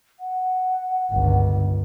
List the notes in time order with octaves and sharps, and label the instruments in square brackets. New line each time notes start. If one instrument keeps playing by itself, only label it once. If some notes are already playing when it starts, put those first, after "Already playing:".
[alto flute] F#5
[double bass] G1 C#2